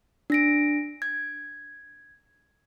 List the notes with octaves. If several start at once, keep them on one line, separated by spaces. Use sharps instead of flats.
D4 A#6 D7
G#6